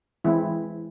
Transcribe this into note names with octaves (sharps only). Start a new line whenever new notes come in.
E3 G#3 C4 E4